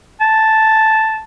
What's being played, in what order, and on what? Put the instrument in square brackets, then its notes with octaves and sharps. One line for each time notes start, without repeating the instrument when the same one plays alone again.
[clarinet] A5